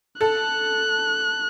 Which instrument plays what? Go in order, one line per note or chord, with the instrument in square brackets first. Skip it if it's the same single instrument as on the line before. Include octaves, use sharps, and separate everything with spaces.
[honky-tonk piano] A4 [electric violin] F#6